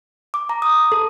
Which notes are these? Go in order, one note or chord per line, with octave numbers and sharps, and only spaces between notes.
D6
A#5
D#6
A4